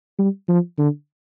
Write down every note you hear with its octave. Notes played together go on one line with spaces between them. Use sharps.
G3
F3
D3